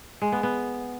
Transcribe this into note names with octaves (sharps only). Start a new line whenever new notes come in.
G#3
B3
B3